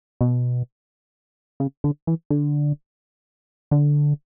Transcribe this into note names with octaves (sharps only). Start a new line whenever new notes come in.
B2
C#3
D3
E3
D3
D3